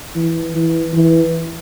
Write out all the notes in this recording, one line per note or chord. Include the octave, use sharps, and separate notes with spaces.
E3
E3
E3